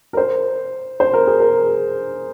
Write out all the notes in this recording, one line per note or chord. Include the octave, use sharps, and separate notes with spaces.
A#4
C5
C5
A#4
G#4
A#4